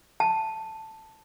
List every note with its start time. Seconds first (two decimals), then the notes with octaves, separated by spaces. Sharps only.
0.20 A5